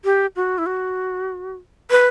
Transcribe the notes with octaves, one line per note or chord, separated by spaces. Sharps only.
G4
F#4
E4
F#4
B4